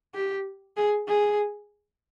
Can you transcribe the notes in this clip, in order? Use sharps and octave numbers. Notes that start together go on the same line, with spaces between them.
G4
G#4
G#4